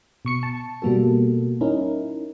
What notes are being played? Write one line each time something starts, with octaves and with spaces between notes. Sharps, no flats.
B2 C#6 C#7
A5
B2 G3 A#3 F#4 A4
C#4 D#4 E4 A#4